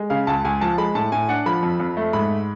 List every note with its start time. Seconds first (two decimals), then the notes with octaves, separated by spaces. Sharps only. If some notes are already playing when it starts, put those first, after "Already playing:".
Already playing: G#3
0.10 C#3 F5
0.27 C#2 A5
0.45 C#2 G#5
0.61 F3 A5
0.78 G#3 B5
0.95 A2 A5
1.12 A2 G#5
1.29 D4 F#5
1.46 F3 B5
1.63 F2
1.80 F2
1.97 A3
2.13 G#2 B5